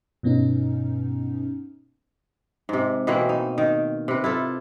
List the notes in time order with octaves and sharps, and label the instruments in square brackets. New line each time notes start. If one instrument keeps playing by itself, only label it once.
[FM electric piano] G2 B2 B3 C#4 D#4
[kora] G#2 C3
B2 E3 A#3 C4
D#4
D#3
C3 B4
E4 F4 A4